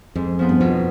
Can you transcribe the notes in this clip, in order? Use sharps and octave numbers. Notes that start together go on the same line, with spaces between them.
F2 G#2
F3 B3 D#4
G2
F2 B2